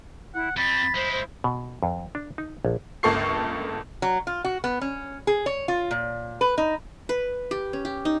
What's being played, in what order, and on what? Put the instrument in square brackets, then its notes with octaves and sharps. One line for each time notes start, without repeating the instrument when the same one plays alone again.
[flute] E4 [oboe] F#5
[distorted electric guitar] F2 C4 [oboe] B5 [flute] A6
[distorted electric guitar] G#3 E4 [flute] C5
[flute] C5
[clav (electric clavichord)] B2
F2
D4
D#4
A#1
[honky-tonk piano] G1 C#2 A#3 A4 C#6 C7
[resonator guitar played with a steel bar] F#3
F4
F#4
B3
C#4
G#4
C#5
F4
A#2
B4
D#4
[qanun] B4
G4
C#4
G4
D#4